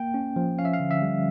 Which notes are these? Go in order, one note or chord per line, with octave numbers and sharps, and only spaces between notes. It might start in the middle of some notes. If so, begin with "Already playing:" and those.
Already playing: A#3 G5
C#4
F3
C#4 F5
E5
F5
D3
E5
G3